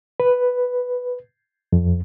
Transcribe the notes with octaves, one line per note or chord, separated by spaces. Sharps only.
B4
F2